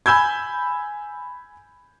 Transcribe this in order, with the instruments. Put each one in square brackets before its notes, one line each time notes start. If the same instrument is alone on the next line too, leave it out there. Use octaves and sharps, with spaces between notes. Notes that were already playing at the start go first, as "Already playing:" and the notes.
[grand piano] G#5 B5 E6 G6 G#6